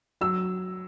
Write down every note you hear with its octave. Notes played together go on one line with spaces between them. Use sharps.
F#3 E6